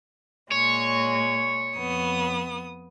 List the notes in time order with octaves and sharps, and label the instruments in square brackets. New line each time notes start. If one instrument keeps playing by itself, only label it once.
[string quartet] A#2 G#3 [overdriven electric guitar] C#5
[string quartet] F2 B3 D#6